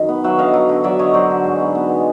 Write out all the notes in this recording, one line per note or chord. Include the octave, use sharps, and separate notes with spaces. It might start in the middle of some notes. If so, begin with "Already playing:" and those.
Already playing: F#2 D#3
B3
F#3 E5 F#5
D3 D#5 F5
F#3
D3
F#3 D5 E5
D3 C#5 D#5
F#3 C5 D5
D3
G#2
B3
B3
G#3